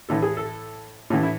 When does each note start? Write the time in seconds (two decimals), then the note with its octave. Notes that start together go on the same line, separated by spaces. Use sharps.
0.09 A2 E3 A4
0.22 G#4
0.37 A4
1.10 A2 E3
1.23 E4